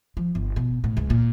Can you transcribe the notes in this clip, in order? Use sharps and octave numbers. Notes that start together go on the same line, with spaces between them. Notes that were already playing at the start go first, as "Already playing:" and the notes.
F3
G1
B2
A2
C#2
A#2